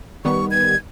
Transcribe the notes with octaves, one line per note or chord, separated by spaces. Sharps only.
D#3 G3 B3 C#6
G#6